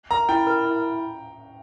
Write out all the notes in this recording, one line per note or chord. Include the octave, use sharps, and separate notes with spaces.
A#4 A#5
E4 G5
A#4
E4